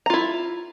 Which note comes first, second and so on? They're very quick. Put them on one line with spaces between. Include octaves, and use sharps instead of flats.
A#5 F4 E4